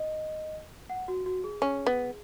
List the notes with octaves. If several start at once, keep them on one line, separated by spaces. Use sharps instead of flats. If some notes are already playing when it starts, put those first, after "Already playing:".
Already playing: D#5
F#5
F#4
F#4
G#4
C#4
B3